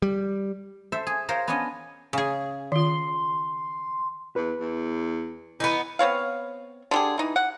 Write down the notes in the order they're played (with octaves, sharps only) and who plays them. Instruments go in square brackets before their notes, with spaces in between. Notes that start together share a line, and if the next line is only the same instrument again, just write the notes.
[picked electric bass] G3
[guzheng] A4 C5 E5
G#4
F4 A#4 C5 C#5
B3 C#4 D4 C#5 D#5
[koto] C#3 G#4
[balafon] D#3 F4 [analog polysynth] C6
[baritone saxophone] E2 [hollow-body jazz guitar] B4
[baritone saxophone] E2
[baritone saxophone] E3 [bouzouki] B3 D#4
[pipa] B3 C4 C#5 F5
D3 G4 G#4
E3 D#4
F#5